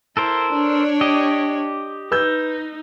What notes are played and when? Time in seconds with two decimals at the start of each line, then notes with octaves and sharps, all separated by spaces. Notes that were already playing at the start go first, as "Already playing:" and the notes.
0.17 E4 A4 A#4 C5
0.53 D4 C#5
1.01 G4 D#5
2.11 D#4 B4 E6 G6